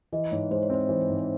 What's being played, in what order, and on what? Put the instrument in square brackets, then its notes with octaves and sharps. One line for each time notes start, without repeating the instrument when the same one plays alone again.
[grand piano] E3 [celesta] D#5
[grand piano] G#2 [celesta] C#5
[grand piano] G#3 [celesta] C5
[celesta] C#5
[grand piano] C4 [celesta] C5
[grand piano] E3
G#2